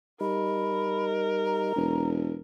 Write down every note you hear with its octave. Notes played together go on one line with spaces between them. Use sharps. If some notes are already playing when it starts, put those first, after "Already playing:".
G3 D#4 A#4 B5
A#5
E1